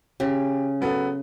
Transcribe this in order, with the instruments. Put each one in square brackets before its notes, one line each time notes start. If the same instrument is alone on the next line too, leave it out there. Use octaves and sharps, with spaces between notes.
[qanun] C#3 [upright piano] G4
[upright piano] F#3 B3 A4